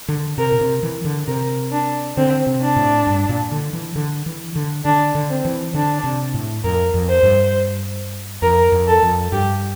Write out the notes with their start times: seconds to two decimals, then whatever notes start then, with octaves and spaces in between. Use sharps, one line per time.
0.08 D3
0.38 C3 A#4
0.52 A#2
0.61 C3
0.83 E3
1.05 D3
1.27 C3 A#4
1.72 D4
2.17 D3 C4
2.47 C3
2.61 D4
2.76 A2
3.07 G2
3.29 A#2
3.52 D3
3.73 E3
3.96 D3
4.26 E3
4.55 D3
4.85 D3 D4
5.15 D3
5.30 C4
5.45 E3
5.74 D3 D4
6.04 C3
6.34 A2
6.64 F2 A#4
6.94 F2
7.09 C5
7.23 G2
8.42 F2 A#4
8.72 F2
8.87 A4
9.02 F2
9.32 G2 G4